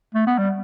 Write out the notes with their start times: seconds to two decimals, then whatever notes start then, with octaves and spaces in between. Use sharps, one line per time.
0.14 A3
0.27 B3
0.38 G3